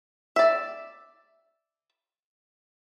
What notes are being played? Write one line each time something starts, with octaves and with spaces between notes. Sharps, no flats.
D5 E5